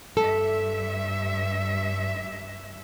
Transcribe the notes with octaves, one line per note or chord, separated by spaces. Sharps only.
G2 A4 E5